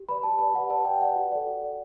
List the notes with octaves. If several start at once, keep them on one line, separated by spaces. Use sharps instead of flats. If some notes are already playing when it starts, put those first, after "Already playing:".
Already playing: G4
B4 D5 B5
G4 A5
B4 D5 A5
G4 F#5
B4 D5 A5
G4 G5
B4 D5 F#5
F#4
A4 D5
F#4
A4 D5